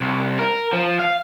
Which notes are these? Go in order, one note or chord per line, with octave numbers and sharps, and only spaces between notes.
C2
A#4
F3
F5